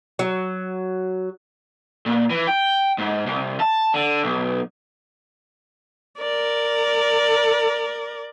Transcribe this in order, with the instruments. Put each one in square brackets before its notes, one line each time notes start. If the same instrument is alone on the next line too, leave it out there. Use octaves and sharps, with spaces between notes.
[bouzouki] F#3
[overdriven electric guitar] A#2
E3
G5
G#2
C2
A5
D3
B1
[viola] A#4 D5